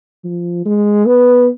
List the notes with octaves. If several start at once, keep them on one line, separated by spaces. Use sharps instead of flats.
F3
G#3
B3